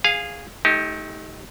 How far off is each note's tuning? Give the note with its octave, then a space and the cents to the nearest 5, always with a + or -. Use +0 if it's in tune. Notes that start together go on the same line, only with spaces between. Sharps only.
G#4 -15 F5 +0 G#5 +0
A3 -20 D#4 +25 G4 +0